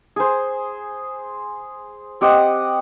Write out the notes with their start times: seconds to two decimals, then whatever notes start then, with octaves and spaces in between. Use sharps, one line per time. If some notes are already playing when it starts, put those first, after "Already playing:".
0.16 G#4 C5
2.21 C4 G4 D#5 F#5